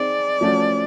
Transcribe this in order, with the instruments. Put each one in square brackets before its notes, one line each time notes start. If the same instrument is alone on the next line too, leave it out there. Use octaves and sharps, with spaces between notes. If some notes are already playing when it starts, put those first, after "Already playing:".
Already playing: [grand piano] C4 D#4 G#4 [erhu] D5
[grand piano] F3 A3 C#4 F#4